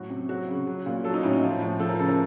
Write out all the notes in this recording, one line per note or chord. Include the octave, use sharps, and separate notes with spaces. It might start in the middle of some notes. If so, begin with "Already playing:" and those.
Already playing: A2 F#3 F#4
C3
F#3 F#4
C#3
F#3
A#2
F#3 A4
D#4
A2 C#4
D#4
F3 F4
A2
F3 A4
A#4
C#3 A4
A#4